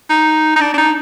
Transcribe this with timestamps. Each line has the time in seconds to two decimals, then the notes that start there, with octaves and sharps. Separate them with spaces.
0.10 D#4
0.56 D#4
0.61 D4
0.74 D4
0.78 D#4